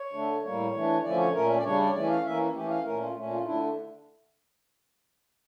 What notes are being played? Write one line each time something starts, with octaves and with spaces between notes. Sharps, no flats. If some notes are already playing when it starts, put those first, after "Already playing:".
Already playing: C#5
D3 A3 D4
A2 G3 A#3 C#5
E3 A3 D4
D3 F3 A3 C#4 D5
C#5
A#2 A3 C#4 A#4
D5
C#3 G3 D4 C#5
D5
C#5
E3 A3 C#4 D5
F5
E3 A#3 C#4 E5
E3 A3 C#4 G4
F5
A#2 A3 C#4 A#4
F4
A#2 A3 C#4
F4
D3 A3 D4 E4